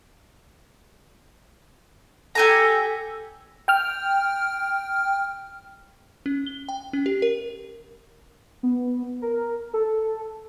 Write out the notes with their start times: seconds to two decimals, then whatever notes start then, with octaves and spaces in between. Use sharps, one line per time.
2.35 G4 A4 G#5 A#5
3.68 G5 F6
6.26 C#4
6.47 G7
6.69 G5
6.93 C#4
7.06 G4
7.22 A#4
8.63 B3
9.22 A#4
9.74 A4